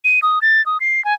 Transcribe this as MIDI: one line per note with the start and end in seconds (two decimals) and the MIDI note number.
0.04 0.20 99
0.22 0.39 87
0.42 0.64 93
0.66 0.78 87
0.81 1.04 96
1.05 1.14 80